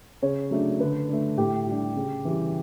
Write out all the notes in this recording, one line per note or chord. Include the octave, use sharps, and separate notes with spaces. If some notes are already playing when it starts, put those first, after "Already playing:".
C#3 C#5
F#3 A3 D4
D3 B4
A3 D4
A2 G4
G3 D4
C#3
E3 G3